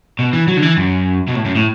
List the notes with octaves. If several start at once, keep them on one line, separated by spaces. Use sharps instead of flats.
B2
E3
F#3
D3
E3
F#2
B2
A2
F#2
A2